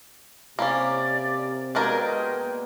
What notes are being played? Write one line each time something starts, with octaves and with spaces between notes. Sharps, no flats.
C3 A#3 C#4 G4 D5
B2 G#3 A#3 D4 F#4 A#4 D#5 G5